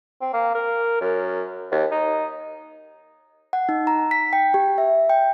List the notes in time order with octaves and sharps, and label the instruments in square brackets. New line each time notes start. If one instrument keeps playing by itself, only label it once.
[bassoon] C4
A#3
A#4
F#2
D#2
D#4
[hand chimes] F#5
D#4
A#5
B6
G5
G4
E5
G5